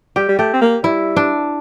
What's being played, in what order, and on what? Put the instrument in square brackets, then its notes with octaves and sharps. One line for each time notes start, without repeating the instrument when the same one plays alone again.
[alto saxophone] G3 [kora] G4
[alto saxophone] G3
[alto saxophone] A3 [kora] G4
[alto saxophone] C4
A#3
[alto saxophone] G3 [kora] E4
[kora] D4